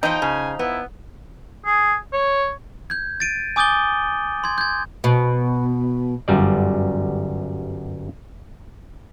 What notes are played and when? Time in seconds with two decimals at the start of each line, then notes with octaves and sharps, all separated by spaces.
0.03 E2 F3 D#4 G5
0.22 C#3 G#5
0.59 B3 E4
1.66 G#4
2.13 C#5
2.90 G6 G#6
3.20 A6 D7 D#7
3.56 G#5 D6 D#6 G6 A6 G7
4.44 C6 G#6
4.58 G6 G#6
5.04 B2
6.28 G1 F#2 G3 D5